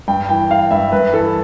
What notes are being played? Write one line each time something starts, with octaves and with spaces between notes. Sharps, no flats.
G2 G5
E3 G5
E3 F5
G2 E5
G2 B4
E3 A4